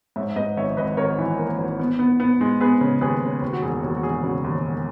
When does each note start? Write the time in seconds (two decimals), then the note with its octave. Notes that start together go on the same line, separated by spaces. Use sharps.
0.16 G#2 C#5 E5
0.36 G#2 B4 D#5
0.57 G#1 C#5 E5
0.77 G#1 B4 D#5
0.97 G#1 A#4 C#5
1.19 E3
1.39 A#3
1.58 G#1
1.79 B3
1.99 B3
2.20 B3
2.41 G#3
2.60 B3 G#4 B4
2.81 C#3
3.01 D#2 G#4 B4
3.22 C#3
3.42 D#2
3.53 F#4
3.62 E1 G#4
3.83 D#2 F#4
3.97 F#4
4.03 E1 G#4
4.23 C#3 F#4
4.44 D#2
4.64 E1